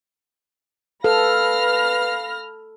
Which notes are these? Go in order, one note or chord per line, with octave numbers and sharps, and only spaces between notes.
A4 B4 F5 B5 F6 A#6